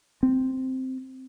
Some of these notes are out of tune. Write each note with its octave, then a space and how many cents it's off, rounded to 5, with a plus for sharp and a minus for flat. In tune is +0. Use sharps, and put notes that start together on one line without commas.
C4 -5